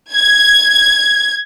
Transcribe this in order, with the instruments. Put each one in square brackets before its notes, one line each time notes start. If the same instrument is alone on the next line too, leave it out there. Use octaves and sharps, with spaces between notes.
[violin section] G#6